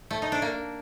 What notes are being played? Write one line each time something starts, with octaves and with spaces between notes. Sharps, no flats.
A3
D#4
D4
A#3